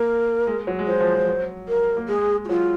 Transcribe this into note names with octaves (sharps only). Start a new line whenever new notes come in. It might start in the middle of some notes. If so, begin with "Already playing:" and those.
Already playing: A#3 A#4
G#3
F#3
G#3
F#3 C5
F3
F3
F#3
A#4
A#3
G#3 G#4
F#4
F#3 F4